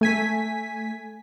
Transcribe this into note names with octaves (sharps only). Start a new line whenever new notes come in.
A3 G#5 B6